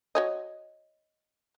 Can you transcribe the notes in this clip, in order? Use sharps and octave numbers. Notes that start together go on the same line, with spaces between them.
F#4 C#5 D#5